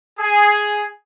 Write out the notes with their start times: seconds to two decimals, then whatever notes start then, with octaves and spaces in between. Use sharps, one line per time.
0.19 G#4